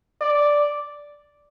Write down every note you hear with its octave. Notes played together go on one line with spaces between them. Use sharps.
D5